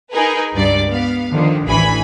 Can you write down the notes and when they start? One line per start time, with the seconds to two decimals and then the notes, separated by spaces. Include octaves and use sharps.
0.11 D#4 G#4 A#4 B4
0.54 C#2 G2 D5
0.89 B3 F5
1.32 D3 D#3 F3
1.67 A1 D2 E3 G#5 B5